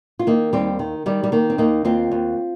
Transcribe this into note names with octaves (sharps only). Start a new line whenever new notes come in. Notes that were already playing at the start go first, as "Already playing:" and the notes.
F4
D#3 A#3 D#4
D#2 G3 C4
D#3
D#3 G3
G3
D#3 A#3
C4
D#2 A#3 D#4
D#2 C4 F4
D#2